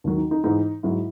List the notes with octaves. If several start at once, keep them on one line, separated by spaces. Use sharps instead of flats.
D#2 D#3 F#3
D#4
D#4
G#2 E3 D#4
G#2 F#3 E4